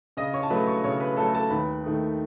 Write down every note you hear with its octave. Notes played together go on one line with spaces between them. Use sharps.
C#3 D#5 D#6
C#5 C#6
A5
F#3 A3 B4 B5
C#5 C#6
C#3 C#5 C#6
B4 B5
F#3 A3 A4 A5
A4 A5
D#2 B4 B5
D#3 A3 D#4